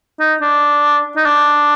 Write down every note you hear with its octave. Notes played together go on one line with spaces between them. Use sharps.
D#4
D4
D#4
D4